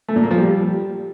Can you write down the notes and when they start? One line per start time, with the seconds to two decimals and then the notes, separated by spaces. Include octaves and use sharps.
0.08 A3
0.16 A#2
0.23 A#3
0.31 F3
0.38 G3